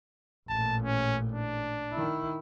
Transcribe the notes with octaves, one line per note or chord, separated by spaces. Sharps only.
A1 A#2 A5
C#4
D4
D#3 E4